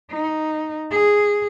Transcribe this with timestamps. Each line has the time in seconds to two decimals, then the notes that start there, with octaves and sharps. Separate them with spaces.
0.10 D#4
0.90 G#4